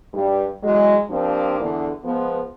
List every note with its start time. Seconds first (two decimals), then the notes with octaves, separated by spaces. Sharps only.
0.14 G2 G3
0.63 E2 F#3 G#3
1.10 F3 G3 A#3 C4 D4
1.60 E2 D3
2.04 F3 G#3 B3